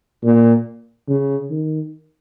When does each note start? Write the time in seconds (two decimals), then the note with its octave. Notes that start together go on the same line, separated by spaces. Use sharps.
0.23 A#2
1.08 C#3
1.51 D#3